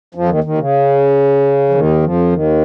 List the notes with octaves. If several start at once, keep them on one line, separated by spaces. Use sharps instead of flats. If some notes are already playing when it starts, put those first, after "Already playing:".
F2 F3
D#2 D#3
D#2 D#3
C#3
F3
D#2 D#3
F2 F3
D#2 D#3